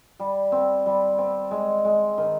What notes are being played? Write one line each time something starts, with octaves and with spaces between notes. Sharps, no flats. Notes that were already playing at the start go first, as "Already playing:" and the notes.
G3
C4
G3
C4
G#3
G#3
D#3